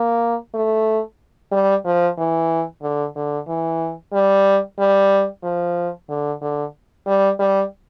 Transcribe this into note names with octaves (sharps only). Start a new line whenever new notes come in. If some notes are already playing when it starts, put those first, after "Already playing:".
Already playing: A#3
A3
G3
F3
E3
D3
D3
E3
G3
G3
F3
D3
D3
G3
G3